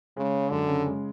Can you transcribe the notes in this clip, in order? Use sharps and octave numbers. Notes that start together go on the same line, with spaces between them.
C#3 G#3
B3
F#2 D3
C#3
G#3